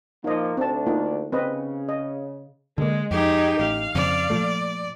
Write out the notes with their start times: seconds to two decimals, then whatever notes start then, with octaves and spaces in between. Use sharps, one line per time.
0.24 A#2 F3 A#3 D#4 D#5
0.57 D2 C4 D4 A5
0.86 A#3 D#4 F4
1.32 C#3 C4 B4 D#5
1.89 D#5
2.78 D3 G#3 A#3
3.11 F2 D#4 G4 G#4
3.60 A1 F5
3.95 F2 C#3 C4 D5
4.30 A#2 F3 A3